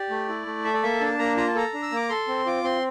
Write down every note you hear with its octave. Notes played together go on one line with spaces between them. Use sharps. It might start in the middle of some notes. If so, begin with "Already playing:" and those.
Already playing: G4 D5
A3
E4
A3
A4 E5
D5
A#3 E5
D4 A5
A#3 A#5
F4 A#5
A5
A4 A#5
D4
E6
A#3 D6
A4 C6
C4
F4 D6
C4 C6